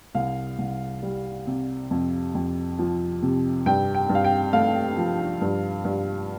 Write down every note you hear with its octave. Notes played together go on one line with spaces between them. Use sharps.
C2 F5
C2
G3
C3
F2
F2
F3
C3
G2 G5
G5
G2
F5
G5
A3 F5
F3
G2
G2